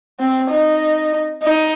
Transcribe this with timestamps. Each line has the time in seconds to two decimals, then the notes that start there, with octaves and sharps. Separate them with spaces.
0.20 C4
0.51 D#4
1.43 D#4